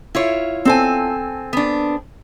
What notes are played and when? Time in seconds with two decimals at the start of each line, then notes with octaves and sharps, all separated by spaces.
0.15 E4 F4 C#5
0.65 C4 A4 G#5
1.53 B3 D4